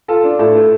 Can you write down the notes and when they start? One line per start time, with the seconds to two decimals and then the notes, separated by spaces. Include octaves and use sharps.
0.08 F4 A4
0.24 D4
0.39 A2 A4
0.55 A3